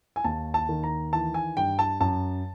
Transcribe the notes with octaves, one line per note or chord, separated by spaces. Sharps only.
G#5
D#2 A5
A5
D#3
A#5
E3 A5
G#5
G2 G5
A5
F#2 A5